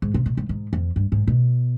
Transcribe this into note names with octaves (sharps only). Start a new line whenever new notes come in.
G#2
C3
B2
G#2
G#2
F2
G2
G#2
B2